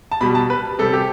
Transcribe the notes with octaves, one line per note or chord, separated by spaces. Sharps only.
A5
B2 G3 B5
A5
B4
C3 G3 A4
G4